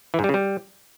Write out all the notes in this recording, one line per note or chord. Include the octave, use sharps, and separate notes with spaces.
E3
G#2
G3
C#3
G3